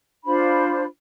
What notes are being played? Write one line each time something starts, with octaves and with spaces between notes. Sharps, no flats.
D4 F4 C5 B5